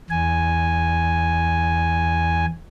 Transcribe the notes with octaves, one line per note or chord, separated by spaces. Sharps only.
E2 G#5